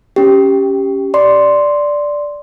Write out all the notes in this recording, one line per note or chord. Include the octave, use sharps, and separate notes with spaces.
C#4 G4
D5 C6